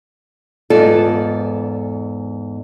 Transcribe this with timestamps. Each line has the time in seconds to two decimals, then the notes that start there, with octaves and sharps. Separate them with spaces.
0.70 E2 G#2 B3 F4 A4 D5